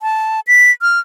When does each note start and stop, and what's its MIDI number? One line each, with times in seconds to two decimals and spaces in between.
0.02 0.40 81
0.47 0.71 95
0.82 0.99 89